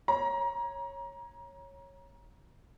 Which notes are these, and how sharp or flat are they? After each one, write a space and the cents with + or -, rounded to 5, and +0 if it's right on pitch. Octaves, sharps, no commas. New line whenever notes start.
C#5 -10 A#5 +25